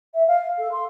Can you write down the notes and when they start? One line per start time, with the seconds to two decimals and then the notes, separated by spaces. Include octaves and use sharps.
0.14 E5
0.27 F5
0.58 A4
0.71 C6